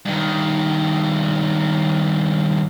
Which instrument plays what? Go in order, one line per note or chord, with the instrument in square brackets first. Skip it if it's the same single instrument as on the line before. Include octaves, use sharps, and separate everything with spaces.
[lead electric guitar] G2 D#3